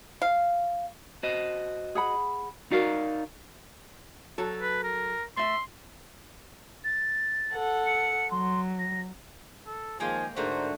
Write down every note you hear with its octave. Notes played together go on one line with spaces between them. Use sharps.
F5
F#4 C5 D#5
G#4 F#5 B5
D#4 F#4 A#4 D5 F5
F#3 A4
B4
A#4
A3 E5 C6
A6
A4 F#5
C#7
F#3 C6
A#6
A4
D#3 F3 G#3 A#3 G5 G#5
G#2 D3 A3 F#4 A#4 C5